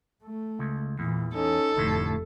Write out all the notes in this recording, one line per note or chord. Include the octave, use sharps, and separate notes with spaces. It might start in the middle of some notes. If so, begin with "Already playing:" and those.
A3
C#2
E2 A#2 E3
C#4 D#4 A4
F1 D2 A2